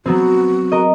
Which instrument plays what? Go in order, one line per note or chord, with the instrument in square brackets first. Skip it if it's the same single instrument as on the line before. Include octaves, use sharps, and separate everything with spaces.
[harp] F#3 B3 C4 [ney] F#4
[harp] A#4 D#5